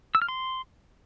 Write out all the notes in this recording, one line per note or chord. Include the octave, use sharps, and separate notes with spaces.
E6
F6
C6